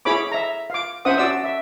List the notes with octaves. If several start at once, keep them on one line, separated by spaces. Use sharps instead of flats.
E4 G#4 C#5 B5 D6
E5 A#5
F5 D6
C#4 C5 E5 F#5 D#6
F#4 D5 E6
E5